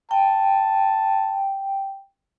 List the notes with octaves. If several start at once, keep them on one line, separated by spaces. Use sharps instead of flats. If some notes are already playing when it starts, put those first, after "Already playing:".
G5 A5